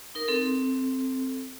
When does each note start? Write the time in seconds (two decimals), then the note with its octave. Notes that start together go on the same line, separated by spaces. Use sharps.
0.15 D#4 A#4
0.28 C4 A4